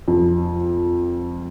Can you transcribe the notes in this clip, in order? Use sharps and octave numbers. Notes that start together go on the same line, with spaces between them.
F2